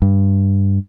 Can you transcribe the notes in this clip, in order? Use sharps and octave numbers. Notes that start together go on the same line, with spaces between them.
G2